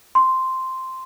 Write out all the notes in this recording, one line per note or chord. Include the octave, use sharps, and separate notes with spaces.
C6